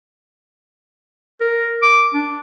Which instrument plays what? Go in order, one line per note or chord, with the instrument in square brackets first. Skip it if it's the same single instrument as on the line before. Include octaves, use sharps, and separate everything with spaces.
[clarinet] A#4
D6
D4